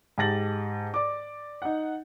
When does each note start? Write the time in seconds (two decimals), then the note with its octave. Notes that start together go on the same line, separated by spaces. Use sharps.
0.18 G#2 G4 A5 A6 A#6 F#7
0.94 D5 D6
1.62 D#4 F#5